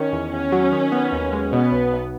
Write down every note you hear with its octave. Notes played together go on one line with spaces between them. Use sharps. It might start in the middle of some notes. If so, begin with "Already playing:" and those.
Already playing: D#3 C#4
E2
E2 C#4
F#3
D#3
B3
D#2
G#3
B2 B3
B1
B1